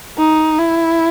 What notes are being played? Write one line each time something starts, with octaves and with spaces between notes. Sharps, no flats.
D#4
E4